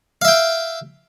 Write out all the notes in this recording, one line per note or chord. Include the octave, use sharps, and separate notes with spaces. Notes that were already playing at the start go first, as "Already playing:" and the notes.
E5 F5 G5